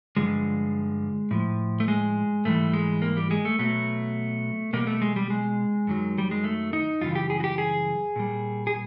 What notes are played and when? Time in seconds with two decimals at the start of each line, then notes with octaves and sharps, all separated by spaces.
0.17 G2 D3 F3 G#3
1.31 A2 F3
1.80 A3
1.88 G#3
2.45 G#2 E3 G3 A3
2.73 G#3
3.02 A#3
3.17 G3
3.31 G#3
3.45 A3
3.59 B2 F#3 A3
4.73 B2 G3 A#3
4.87 A3
5.02 G#3
5.16 G3
5.30 G#3
5.87 F#2 D#3 F#3
6.18 G3
6.31 G#3
6.44 A3
6.73 D#4
7.01 F#2 C#3 E3 G3 F4
7.15 G4
7.30 G#4
7.40 F#4
7.44 G4
7.58 G#4
8.16 A#2 G3
8.67 G#4